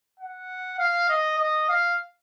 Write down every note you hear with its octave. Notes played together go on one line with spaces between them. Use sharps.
F#5
F5
D#5
D#5
F5